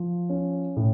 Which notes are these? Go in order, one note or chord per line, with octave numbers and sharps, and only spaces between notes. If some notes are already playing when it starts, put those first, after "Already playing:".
Already playing: F3
C#4
A2